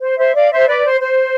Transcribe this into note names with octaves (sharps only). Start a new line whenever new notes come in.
C5
C5 E5
D5 F5
C5 E5
B4 D5
C5
C5